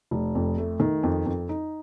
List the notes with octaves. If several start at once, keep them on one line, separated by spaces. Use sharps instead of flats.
F1
F2
A3
D#3
F2
F2
D#4